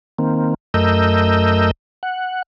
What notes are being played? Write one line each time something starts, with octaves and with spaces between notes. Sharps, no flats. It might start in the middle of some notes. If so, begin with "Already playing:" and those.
D#3 A#3 C4
F#2 A3 A#4 D#5 E6 G6
F#5